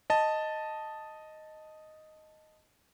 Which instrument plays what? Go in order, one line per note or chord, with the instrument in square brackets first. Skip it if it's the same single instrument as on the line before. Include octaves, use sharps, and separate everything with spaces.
[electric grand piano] D#5 A5